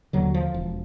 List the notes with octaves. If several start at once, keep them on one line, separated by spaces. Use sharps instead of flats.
D#2 D3 F#3
F3
E1